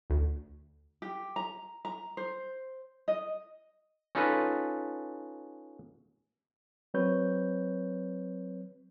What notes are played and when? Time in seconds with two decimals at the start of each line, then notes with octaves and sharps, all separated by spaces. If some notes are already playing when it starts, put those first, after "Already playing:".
0.10 D2
1.02 G4
1.36 A#5
1.85 A#5
2.17 C5
3.08 D#5
4.15 C#4 D#4 F4 A4 B4
6.94 F#3 C4 B4 C#5 G6